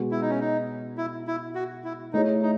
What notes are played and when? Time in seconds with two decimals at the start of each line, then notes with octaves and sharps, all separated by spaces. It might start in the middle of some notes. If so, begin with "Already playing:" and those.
Already playing: B2 G#3 B3 F#4
0.11 E4
0.21 D#4
0.30 C#4
0.40 D#4
0.98 E4
1.27 E4
1.55 F#4
1.84 E4
2.13 A3 D#4 E4 G#4 C#5
2.42 D#4